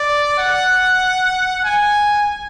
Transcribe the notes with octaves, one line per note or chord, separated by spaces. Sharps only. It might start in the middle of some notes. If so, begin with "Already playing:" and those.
Already playing: D5
F#5
G#5